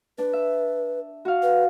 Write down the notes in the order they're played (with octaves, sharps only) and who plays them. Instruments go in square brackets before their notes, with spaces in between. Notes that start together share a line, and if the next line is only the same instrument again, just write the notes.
[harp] D4 [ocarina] B4
[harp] E5
F#4 F5
[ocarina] B4